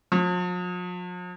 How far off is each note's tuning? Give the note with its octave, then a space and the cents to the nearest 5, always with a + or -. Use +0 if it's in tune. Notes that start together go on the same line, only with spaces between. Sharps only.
F3 +45